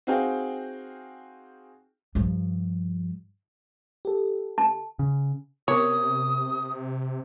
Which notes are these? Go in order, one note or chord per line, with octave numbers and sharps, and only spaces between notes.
C4 D#4 F#4 G#4 F5 G5
G2 F3
G4 A4
A5
C#3
C3 B3 A#4 C#5 D6 D#6